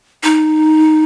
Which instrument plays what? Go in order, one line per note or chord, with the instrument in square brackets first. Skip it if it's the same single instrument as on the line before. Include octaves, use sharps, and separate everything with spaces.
[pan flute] D#4